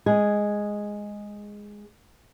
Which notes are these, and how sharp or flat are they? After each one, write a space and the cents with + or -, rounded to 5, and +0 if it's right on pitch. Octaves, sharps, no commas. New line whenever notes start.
G#3 -5 G#4 +0